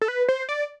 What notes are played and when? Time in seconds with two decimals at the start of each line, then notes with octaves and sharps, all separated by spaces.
0.02 A4
0.08 B4
0.29 C5
0.49 D5